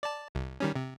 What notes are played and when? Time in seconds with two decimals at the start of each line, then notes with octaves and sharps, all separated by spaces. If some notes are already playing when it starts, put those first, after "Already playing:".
0.03 D5 A5
0.35 C2
0.60 D#3 G3 C#4
0.75 C3